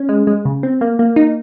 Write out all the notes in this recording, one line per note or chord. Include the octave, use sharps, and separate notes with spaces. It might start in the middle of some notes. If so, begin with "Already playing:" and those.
Already playing: C#4
G#3
G#3
C#3
C4
A#3
A#3
D#4